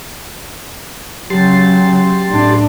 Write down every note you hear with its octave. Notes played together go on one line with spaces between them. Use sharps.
C#3 F#3 G4 A5 C6
A2 D4